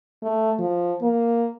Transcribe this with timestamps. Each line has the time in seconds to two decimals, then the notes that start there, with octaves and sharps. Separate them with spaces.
0.23 A3
0.59 F3
1.02 A#3